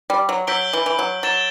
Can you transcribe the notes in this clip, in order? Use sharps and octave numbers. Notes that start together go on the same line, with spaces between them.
G3
F#3
F#3 E6 G6 B6 D7 G7
E3
E3
F#3
F#3 A6 E7 G7